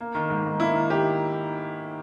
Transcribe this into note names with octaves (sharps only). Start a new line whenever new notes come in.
A#3
D#3
G#2
G#2
A#3 E4
D#3
G4